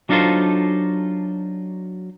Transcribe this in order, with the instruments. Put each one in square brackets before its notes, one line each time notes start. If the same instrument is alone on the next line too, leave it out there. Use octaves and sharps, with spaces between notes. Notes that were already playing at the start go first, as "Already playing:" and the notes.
[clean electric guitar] F#3 D4 D#4 F4 A4 C5